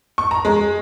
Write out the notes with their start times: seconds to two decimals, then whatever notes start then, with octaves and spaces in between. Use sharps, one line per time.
0.18 C#6
0.31 A#5
0.45 G#3